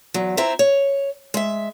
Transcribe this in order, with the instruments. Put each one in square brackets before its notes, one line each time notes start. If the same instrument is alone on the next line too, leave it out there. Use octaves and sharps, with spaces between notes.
[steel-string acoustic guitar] E2 F#3
C4 E4 C5 E5 A#5
C#5
G#3 E5